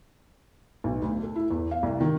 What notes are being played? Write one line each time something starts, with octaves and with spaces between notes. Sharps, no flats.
B1
D2
A4
E4
E2
F5
C2
D#3